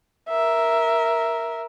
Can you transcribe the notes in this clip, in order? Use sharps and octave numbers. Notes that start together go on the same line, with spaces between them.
A#4 E5